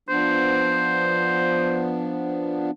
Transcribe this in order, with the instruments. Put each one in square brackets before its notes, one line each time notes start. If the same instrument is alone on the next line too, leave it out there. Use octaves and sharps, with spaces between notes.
[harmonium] F3 B3 D4 [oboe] C5